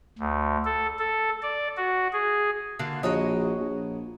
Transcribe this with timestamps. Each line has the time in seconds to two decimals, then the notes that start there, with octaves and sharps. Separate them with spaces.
0.19 D2
0.65 A4
0.99 A4
1.42 D5
1.76 F#4
2.13 G#4
2.79 D3 A#3 F#4
3.03 A#1 F#4 C#5 D#5
3.60 A#1